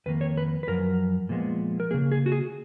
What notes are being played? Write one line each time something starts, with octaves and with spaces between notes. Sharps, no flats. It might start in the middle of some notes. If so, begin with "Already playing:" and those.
F2 D#3 A#3 B4
C#5
B4
B4
F#2 F3 A#4
A#2 F3 G#3 B3
A#4
C#3 F3 A#3 G#4
G#4
F#4
G#4